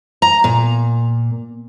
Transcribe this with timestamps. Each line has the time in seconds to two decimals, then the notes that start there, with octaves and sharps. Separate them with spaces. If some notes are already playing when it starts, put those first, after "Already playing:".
0.22 A#5
0.44 A#2